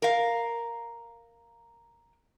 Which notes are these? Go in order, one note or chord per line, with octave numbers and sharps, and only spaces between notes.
A#4 F5